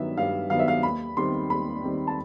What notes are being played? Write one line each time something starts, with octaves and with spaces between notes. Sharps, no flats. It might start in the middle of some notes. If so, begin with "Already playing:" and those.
Already playing: G2 D#3 F#3 B3 E5
G2 F5
D#3 F#3 B3 F5
E5
F5
D#2 B5
D#3 G3 C4 C6
D#2 B5
D#3 G3 C4
A5